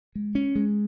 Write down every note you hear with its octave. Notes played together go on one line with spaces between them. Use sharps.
G#3
C#4
G#3